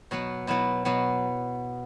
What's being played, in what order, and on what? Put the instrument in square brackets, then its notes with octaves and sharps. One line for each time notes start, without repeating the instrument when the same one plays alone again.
[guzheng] B2 F#3 B3
B2 F#3 B3 E4
B2 F#3 B3